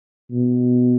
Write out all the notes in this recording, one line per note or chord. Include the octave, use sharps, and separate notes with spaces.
B2